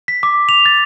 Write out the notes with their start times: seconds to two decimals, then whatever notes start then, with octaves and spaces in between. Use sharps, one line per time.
0.08 B6
0.23 D6
0.49 F7
0.66 A6